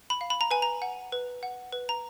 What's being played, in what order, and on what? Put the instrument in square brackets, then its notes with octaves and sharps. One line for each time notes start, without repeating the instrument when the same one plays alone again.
[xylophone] B5
F5
B5
A#5
B4 G#5
A#5
F#5
B4
F#5
B4
A#5